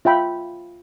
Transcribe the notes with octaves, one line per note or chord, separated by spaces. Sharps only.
F4 E5 G5 B5